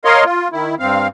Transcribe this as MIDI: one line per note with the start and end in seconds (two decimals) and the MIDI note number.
0.05 0.24 70
0.05 0.24 73
0.05 0.24 75
0.05 0.24 77
0.05 0.24 84
0.25 0.48 65
0.52 0.75 51
0.52 0.75 64
0.79 1.08 43
0.79 1.08 60
0.79 1.08 77